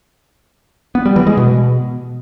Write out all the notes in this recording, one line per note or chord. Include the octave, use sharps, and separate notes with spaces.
B3
G3
E3
G#3
B2